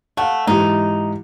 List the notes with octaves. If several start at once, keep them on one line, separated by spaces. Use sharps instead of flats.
A3 F5 F#5
G#2 E3 D#4 G4